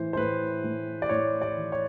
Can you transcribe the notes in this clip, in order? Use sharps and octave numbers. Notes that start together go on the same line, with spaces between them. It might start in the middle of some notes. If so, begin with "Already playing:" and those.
Already playing: A2 E3 C5
C5
A2 B4
A2
D5
A2 C#5
D5
E3
C#5